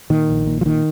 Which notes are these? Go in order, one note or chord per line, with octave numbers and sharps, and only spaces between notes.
A#2 D#3
A#1
A#2
F3
A#2 D#3